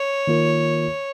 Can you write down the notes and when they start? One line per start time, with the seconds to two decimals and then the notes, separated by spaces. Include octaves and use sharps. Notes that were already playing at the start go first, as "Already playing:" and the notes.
Already playing: C#5
0.27 D#3 A#3 F4 A#4